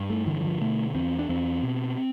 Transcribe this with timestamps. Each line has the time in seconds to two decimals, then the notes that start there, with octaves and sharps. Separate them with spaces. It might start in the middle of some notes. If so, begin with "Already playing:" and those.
Already playing: G2
0.10 A3
0.27 D3 E3
0.40 E3
0.45 F3
0.61 B2 A3
0.95 E2 C4
1.19 D4
1.29 E2 C4
1.63 B2